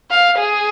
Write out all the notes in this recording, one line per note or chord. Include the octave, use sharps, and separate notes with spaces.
F5
G#4